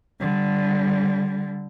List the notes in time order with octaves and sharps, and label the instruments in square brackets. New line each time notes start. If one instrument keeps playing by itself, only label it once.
[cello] D3 G3